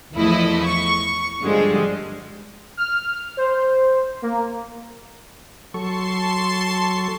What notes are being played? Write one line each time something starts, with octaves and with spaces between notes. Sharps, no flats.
E2 F3 A3 E4 D#5
C#6
G2 D3 F3 G3 G#3
F6
C5
A#3
F#3 A4 A5 C6 C#6 C7